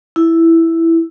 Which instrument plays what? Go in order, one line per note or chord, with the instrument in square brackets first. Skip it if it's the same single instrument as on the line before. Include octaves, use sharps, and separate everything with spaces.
[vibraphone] E4